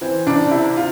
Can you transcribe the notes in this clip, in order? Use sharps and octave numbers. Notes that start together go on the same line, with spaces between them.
E3 C4
C2 D4
C3 E4
F4